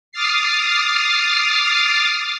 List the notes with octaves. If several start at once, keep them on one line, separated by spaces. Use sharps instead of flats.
D6 D#6 F6 A6 C7